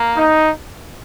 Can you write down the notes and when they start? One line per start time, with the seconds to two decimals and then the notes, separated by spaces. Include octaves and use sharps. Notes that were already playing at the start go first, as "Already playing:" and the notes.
Already playing: A#3
0.16 D#4